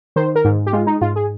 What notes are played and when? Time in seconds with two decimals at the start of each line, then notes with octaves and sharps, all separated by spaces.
0.16 D#3 C5
0.36 A#4
0.45 G#2
0.67 G4
0.73 G#3 F4
0.87 D#4
1.01 G#2 F4
1.16 G#4